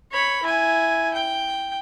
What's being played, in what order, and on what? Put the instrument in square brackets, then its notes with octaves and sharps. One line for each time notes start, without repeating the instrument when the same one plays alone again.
[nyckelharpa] C#5 B5
E4 G#5
G5